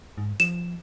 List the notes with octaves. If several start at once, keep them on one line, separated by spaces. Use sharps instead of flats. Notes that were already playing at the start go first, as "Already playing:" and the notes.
G#2
F3 E7